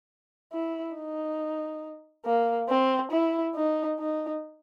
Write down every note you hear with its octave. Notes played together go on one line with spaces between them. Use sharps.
E4
D#4
A#3
C4
E4
D#4
D#4